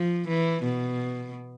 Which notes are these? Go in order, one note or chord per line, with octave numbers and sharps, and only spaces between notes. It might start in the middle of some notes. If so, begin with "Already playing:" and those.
Already playing: F3
E3
B2